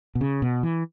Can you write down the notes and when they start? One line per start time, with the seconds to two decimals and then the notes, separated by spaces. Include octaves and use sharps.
0.15 B2
0.21 C#3
0.42 B2
0.63 E3